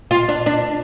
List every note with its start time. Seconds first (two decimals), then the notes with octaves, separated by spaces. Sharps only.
0.11 F4
0.29 D4
0.46 D4